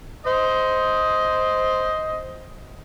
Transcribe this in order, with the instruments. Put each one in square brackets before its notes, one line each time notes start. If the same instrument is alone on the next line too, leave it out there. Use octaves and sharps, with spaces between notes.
[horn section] C5 D#5